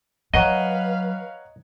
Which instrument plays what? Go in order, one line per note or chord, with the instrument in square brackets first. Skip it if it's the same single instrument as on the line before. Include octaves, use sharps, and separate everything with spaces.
[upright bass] F#3 [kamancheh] B4 F5 [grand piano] C#5 F#5 A#5 [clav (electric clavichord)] D#5